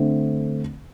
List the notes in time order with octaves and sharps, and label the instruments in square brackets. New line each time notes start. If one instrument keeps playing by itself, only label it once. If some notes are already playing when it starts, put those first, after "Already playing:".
Already playing: [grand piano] D3 A3 C4